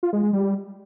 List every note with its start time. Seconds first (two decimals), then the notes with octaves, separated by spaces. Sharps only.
0.03 F4
0.13 G#3
0.23 G#3
0.33 G3